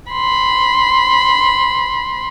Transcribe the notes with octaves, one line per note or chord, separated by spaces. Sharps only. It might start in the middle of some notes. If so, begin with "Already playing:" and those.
B5 C6